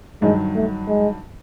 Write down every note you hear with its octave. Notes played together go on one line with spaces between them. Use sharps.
G2 D#3 F#3 G#3
A3
G#3